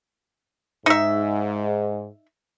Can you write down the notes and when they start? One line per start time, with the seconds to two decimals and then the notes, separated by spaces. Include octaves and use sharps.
0.86 G#2 D#4 E5